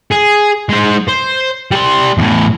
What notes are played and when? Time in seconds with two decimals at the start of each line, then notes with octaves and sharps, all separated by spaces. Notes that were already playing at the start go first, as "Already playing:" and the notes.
0.12 G#4
0.69 G#3 C5
1.08 C5
1.72 G3 C6
2.18 E2 A2